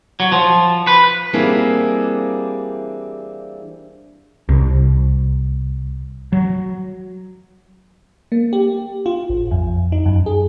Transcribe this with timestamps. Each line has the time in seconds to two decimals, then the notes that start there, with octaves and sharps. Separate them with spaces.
0.20 F#3
0.32 F3
0.87 B4
1.33 E3 G3 A#3 C4 D4 G#4
4.49 C2
6.32 F#3
8.32 A#3
8.53 G4
9.06 F4
9.30 A1
9.51 F2
9.92 D#4
10.06 F#2
10.26 G#4